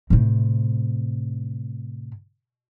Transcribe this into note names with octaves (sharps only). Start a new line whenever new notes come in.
A2 C3